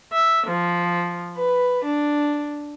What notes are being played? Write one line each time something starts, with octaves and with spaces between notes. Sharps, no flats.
E5
F3
B4
D4